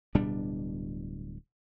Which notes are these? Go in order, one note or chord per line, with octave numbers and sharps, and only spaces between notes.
D1 B2 G3 D4